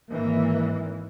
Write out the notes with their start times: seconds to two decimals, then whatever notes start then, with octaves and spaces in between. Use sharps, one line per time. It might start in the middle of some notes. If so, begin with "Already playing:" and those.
0.11 G#1 E3 A#3